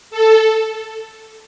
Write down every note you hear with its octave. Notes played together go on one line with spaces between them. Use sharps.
A4